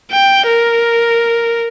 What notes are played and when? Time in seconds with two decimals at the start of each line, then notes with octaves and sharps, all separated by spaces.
0.11 G5
0.47 A#4